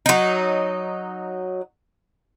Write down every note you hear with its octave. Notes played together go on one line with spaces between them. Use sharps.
F#3 D#4